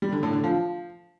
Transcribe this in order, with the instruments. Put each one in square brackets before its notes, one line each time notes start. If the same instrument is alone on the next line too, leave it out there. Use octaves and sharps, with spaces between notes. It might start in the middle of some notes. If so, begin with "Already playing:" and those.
[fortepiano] G3
D3
A2
D3
F3